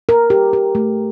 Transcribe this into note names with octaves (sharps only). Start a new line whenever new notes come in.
A#4
G4
G4
A3